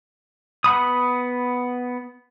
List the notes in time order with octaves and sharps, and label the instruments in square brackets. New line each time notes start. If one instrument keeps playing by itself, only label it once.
[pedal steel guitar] B3 F#5 B5 D#6